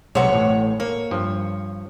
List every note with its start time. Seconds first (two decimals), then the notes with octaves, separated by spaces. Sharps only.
0.15 B1 C3 C5 C#5 F#5
0.33 A1 A2
0.80 A#3 C#5
1.11 G2 F3